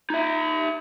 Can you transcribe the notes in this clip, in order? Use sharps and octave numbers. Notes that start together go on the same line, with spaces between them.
D#4 E5